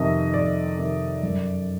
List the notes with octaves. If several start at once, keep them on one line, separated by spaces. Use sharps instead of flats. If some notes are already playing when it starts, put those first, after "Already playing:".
Already playing: F2 C3 D#3 D#5
F2 D5
C3 D#3
F#2